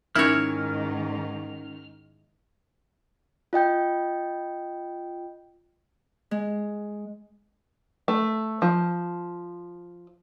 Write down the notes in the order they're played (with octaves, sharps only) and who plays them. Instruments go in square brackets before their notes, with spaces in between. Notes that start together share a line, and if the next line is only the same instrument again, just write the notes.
[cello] G#2 D#3 [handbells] C#4 D#4 A#4 [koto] E4 C#5 [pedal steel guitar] F6
[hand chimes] F4 D#5 G5 G6
[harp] G#3
[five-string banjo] A3
F3